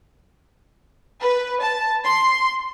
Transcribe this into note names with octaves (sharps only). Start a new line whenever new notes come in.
B4
A5
C6